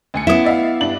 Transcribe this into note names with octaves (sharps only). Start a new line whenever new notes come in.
D2 G#5 C#7
B3 C#4 E4 D#6
D5 E5 F5
G2 D4 F#7